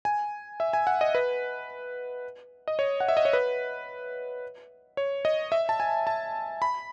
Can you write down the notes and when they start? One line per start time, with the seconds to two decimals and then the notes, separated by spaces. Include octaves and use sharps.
0.05 G#5
0.60 E5
0.73 G#5
0.87 F#5
1.01 D#5
1.15 B4
2.68 D#5
2.79 C#5
3.00 F#5
3.08 E5
3.17 D#5
3.25 C#5
3.33 B4
4.97 C#5
5.25 D#5
5.52 E5
5.69 A5
5.80 G#5
6.07 A5
6.62 B5